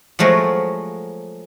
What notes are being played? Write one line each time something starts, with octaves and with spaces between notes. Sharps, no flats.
F3 F#3 G#3 A3